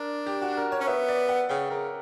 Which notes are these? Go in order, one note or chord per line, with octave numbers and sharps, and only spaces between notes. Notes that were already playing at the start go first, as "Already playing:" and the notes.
Already playing: D4 A#4
G4
F#4
A#4
C#5
C#4
B3 E5
D5
F#5
C#3 G5
C#3 A#4